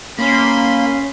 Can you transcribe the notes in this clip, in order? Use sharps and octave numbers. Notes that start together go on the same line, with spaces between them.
A#3 C#4 B5 C6